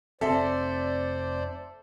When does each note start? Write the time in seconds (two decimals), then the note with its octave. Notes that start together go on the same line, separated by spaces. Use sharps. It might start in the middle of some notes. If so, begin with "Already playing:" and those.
0.21 F1 C4 A4 C5 D5 E5